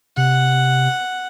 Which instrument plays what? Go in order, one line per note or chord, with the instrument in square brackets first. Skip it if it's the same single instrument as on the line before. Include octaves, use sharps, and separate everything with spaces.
[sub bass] C3 [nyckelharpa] F#5